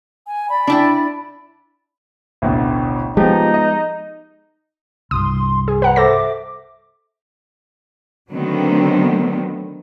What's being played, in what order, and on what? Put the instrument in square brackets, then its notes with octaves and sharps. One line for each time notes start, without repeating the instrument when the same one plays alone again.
[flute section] G#5
D5 B5
[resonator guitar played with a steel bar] D4 E4 G5
[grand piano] A1 D2 B2
[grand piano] F3 G4 [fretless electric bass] G#3 B3 [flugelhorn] D#4
[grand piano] D#5
[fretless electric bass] C2 G2 [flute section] C6 [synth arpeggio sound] D#6
[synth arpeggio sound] G#4
[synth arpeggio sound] B4 F#5 [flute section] A#5
[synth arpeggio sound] A4 C5 A#6 [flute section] E5 D6
[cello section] D3 D#3 F#3 A3 B3 C4